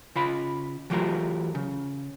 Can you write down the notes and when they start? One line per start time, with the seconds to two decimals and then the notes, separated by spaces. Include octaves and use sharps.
0.16 C#3 F4 B5
0.90 E3 F#3 A3 F4 G4 A#4
1.55 C#3